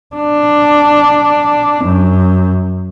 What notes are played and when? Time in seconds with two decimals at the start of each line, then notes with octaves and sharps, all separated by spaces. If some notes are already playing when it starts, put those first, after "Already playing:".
0.16 D4
1.84 F#2